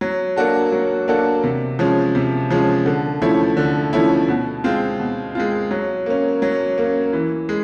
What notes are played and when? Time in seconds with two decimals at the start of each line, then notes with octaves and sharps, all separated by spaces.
0.01 F#3
0.36 A#3 D4 F#4 A4
0.72 F#3
1.08 A#3 D4 F#4 A4
1.44 C3
1.79 F3 G#3 C#4
2.15 C3
2.50 F3 G#3 C#4
2.86 D3
3.22 F3 A3 C#4 E4
3.57 D3
3.93 F3 A3 C#4 E4
4.28 B2
4.64 G#3 C4 F4
4.99 B2
5.35 G#3 C4 F4
5.71 F#3
6.06 A#3 C#4
6.42 F#3
6.78 A#3 C#4
7.13 E3
7.49 G#3